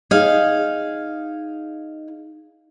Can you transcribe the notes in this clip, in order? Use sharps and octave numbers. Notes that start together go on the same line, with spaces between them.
D#4 G#4 F5